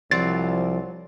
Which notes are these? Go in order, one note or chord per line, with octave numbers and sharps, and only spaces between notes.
C2 F3 F#3 C4 D5 A6